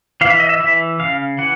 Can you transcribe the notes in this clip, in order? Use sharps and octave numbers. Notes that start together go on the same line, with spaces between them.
E3 F5
E5
D#5
E5
E3 E5
C#3 F5
E3 F#5